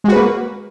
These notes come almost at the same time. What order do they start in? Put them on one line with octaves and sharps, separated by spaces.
G#3 F#4 B4 A#3